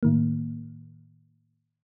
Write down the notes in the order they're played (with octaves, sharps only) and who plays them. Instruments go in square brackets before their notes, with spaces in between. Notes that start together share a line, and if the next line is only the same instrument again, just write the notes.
[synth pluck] A2 D#3 A#3